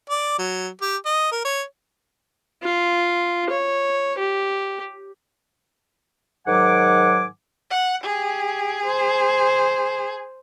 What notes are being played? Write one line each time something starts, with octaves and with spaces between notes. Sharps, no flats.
D5
F#3
G4
D#5
A#4
C#5
F4
C#5
G4
G#2 D#3 F#3 F#5 G#5 D6
F#5
G4 G#4
C5